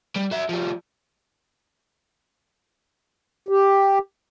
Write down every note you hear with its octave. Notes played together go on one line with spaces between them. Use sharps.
G3
F#4 E5
F3 G3
G4